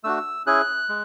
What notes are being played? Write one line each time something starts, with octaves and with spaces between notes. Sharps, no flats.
A3 D4 F#4 E6
C#4 E4 G#4 F#6
G#3